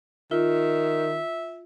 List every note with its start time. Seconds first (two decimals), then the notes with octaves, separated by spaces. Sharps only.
0.31 D#3 F4 E5